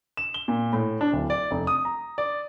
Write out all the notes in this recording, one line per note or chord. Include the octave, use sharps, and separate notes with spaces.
E7
G7
A#2
A2
D4
D1
D5
F1
D#6
A#5
D5